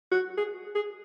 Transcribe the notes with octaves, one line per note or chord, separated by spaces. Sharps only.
F#4
G#4
G#4